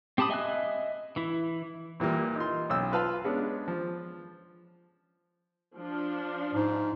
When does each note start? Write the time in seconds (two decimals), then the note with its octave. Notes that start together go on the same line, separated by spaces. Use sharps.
0.18 C4 G4 A5 B5 D#6
0.30 D#5 E5 G#5 D#6 F#6
1.16 E3 E4
2.00 A#2 E3 G3 A#3
2.36 D#4 F4 C6
2.70 B1 C#4 E6
2.92 F4 B4 F5 A5 B5
3.24 G#3 B3 C#4 D4
3.68 F3
5.75 F3 D4
6.55 G#2